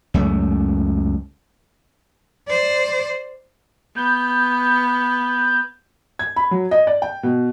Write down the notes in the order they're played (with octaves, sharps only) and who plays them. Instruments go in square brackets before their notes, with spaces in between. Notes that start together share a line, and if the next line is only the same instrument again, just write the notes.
[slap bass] C#2 F#2 A3
[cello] C5 D5
[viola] B3 [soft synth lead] G6
[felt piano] G#6
B5
F#3
D#5
D5
G5
B2